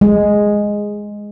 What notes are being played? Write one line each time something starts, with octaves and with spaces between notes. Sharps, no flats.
G#3